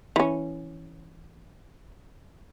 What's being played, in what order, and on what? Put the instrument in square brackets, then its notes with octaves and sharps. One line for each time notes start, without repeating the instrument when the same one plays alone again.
[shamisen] E3 C#4